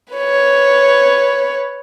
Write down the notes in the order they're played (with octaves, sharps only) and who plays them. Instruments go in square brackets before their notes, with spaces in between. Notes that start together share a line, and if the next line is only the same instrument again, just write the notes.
[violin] B4 C#5